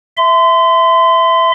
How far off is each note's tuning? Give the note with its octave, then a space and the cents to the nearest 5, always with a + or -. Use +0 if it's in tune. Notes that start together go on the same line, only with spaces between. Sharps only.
E5 +0 C6 -30